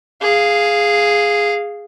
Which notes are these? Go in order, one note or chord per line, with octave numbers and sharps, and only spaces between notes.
G#4 F5